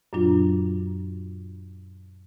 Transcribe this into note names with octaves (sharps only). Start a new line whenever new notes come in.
F#2 A#2 F#3 D4 F4